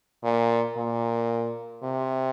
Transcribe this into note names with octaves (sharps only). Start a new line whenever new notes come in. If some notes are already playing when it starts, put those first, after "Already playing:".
A#2
A#2
C3